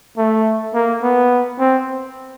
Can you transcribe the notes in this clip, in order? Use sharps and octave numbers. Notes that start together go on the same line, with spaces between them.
A3
A#3
B3
C4